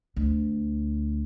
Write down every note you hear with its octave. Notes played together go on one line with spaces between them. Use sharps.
D2